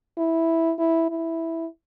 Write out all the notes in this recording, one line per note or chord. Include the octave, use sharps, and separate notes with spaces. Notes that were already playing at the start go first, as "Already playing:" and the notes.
E4
E4
E4